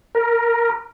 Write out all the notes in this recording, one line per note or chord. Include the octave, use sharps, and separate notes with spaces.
A#4